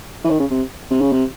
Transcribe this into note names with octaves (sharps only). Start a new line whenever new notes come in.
E3
D#3
C#3
C3
C3
C#3
C3